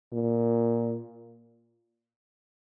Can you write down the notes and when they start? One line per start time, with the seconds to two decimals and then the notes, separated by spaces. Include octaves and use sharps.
0.12 A#2